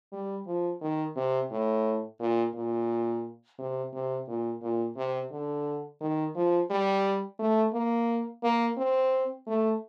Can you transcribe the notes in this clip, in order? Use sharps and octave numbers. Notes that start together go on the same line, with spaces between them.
G3
F3
D#3
C3
A2
A#2
A#2
C3
C3
A#2
A#2
C3
D3
D#3
F3
G3
A3
A#3
A#3
C4
A3